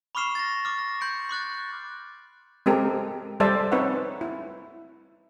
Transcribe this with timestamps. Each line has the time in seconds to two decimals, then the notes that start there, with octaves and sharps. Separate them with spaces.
0.15 B5 C#6 D6 F6 C7 E7
0.35 A6 A#6
0.65 D6 F6
0.79 A#6
1.01 C6 G6 C#7 D7
1.29 C6 D6 F#6 A6
2.66 G#3 C4 G4 A4 A#4
3.40 G3 A4 C5 D5 E5 A5
3.72 C4 D#4 B4 C#5 E5 F#5
4.21 E4